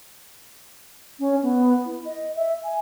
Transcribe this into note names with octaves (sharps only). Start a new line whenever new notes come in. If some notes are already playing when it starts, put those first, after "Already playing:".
C#4
B3
E4
D#5
E5
G#5